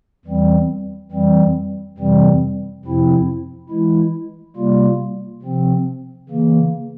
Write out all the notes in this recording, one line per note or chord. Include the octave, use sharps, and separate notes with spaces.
E2 E3 G3 C4
F2 E3 G3 C4
F2 C3 E3 G3 C4
F2 C3 F3 C4 E4
E3 G#3 E4
C3 G3 A#3 F4
C3 F3 C4
C#3 E3 A#3